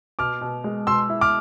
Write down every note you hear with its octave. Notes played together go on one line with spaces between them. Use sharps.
B2 D6 F6
B2
G#3
B2 C6 E6
E4
D6 F6